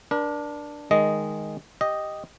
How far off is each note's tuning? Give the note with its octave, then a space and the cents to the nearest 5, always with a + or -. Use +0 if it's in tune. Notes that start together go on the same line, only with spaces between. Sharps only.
D4 +0 A#4 +40
D#3 +0 G#3 +0 D#5 +0
G4 +0 D#5 +0